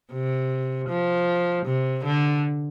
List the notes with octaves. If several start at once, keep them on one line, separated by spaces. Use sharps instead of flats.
C3
F3
C3
D3